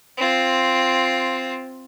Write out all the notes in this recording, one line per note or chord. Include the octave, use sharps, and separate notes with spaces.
C4 F4